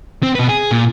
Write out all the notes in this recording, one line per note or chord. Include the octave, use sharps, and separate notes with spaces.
C4
B2 B4
G#4
A#2